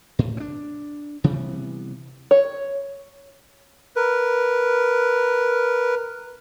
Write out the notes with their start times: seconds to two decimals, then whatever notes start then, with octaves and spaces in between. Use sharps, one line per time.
0.19 A2
0.37 C4 D4
1.24 C3 E3 G3 B3
2.31 C#5
3.96 A#4 B4